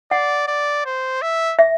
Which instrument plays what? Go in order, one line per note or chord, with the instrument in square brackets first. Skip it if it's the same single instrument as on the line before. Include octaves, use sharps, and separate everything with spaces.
[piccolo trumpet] D5 [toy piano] F#5
[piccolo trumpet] D5
C5
E5
[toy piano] E5